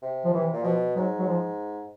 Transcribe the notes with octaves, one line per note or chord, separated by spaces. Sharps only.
C3
F3
C3 E3
A#2
B2 F3
G#2 F#3
F#3
F3